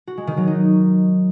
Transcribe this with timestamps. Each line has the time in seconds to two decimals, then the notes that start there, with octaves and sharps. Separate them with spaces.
0.07 F#4
0.17 G#3
0.27 D#3
0.37 F#3
0.47 D#4